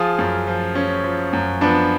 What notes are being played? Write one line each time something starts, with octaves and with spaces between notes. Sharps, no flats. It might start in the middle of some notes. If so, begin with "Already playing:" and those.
Already playing: F3 F4 G#4
F#2
F3
F3 C#4
F3
F#2
F3 B3 D4